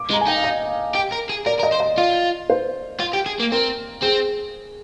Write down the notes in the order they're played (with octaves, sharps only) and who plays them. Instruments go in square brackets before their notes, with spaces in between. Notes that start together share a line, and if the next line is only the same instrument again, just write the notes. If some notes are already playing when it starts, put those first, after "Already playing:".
Already playing: [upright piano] D6
[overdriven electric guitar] G#3
[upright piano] A#5
G#5
[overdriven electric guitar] D#4 [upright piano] G5
[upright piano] F5
D#5
[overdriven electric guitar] G4
A#4
G#4
[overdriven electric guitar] A#4 [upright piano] D5
[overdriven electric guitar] A#4
[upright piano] D#5
[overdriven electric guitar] C5
[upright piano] D#5
[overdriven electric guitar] F4
[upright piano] C5
[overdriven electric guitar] F4
G4
G#4
A#3
[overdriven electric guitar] C4 [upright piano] A#4
[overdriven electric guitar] C4 [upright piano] G#4